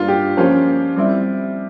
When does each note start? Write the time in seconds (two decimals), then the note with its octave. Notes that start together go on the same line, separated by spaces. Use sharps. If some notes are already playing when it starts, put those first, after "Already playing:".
Already playing: G2 G3 A#3 F4
0.08 G4
0.37 F3 A#3 C#4 F4 C5
0.96 G3 C4 E4